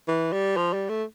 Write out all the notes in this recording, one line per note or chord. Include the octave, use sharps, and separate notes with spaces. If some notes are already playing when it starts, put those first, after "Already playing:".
E3
G3
F3
G3
A3